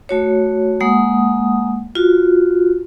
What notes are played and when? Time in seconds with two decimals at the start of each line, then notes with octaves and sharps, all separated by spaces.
0.09 A3 F#4 C#5
0.80 G#3 A#3 F#5 D#6
1.95 F4 F#4